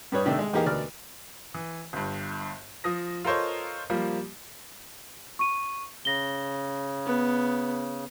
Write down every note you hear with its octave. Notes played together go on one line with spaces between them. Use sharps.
G2 G3 B4 C#5 D#6
C3 D#3 A3 D4 G4
G#3
E2 A#3 D#4 G4 G#4 A#4
D2 B2 A#4 D5 F6
E3
G1 G2
F3 D#6 A#6
F4 A4 A#4 C5 C#5 D#5
F3 G3 A#3
C#6 D#7
C#3 A#6 G7
B3